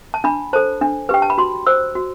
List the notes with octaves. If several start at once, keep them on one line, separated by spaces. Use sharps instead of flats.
A5
D4 B5
A4 C5 A5
D4
G4 B4 G5
A5
B5
F#4 C6
C5 E6
F#4